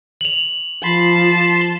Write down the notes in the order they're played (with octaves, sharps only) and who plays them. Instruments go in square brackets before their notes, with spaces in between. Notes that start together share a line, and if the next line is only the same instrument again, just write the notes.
[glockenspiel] F7 F#7
[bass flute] F3 [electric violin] A5 [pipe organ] B5 C6
[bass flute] F3